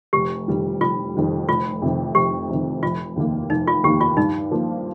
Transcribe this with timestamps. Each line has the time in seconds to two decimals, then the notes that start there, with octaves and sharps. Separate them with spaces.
0.13 F1 G4
0.48 F2 D#3 G3
0.80 F1 F4
1.15 F2 D#3 G3
1.49 F1 F4
1.82 F2 C3 D#3
2.15 F1 G4
2.49 F2 C3 D#3
2.83 F1 F4
3.16 D#2 D#3 A#3
3.50 F1 D#4
3.67 F4
3.83 D#2 D#3 A#3 G4
4.01 F4
4.17 G2 D#4
4.51 F3 A#3